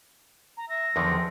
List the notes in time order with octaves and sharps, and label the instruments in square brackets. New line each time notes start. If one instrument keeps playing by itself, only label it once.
[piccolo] A#5
[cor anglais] E5 [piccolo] A#6
[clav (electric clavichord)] E2 D3 D#3 [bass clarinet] F3 [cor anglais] C4